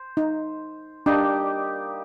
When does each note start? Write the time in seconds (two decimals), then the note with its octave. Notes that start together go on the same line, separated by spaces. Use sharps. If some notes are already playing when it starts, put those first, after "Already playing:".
Already playing: C5
0.17 D#4
1.06 G3 A#3 D4 D#4 G4